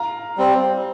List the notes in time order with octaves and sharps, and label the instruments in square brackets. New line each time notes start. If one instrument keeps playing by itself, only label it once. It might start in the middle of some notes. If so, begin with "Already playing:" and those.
Already playing: [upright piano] F5 A#5
[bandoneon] G3 C4